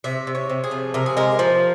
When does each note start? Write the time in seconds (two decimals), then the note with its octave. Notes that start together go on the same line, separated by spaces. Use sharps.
0.04 C3 E5
0.27 C3
0.35 C#5
0.50 C3
0.64 G#4
0.71 F3
0.94 C3 A#4
1.06 G#4
1.17 G#3 A#4
1.39 F3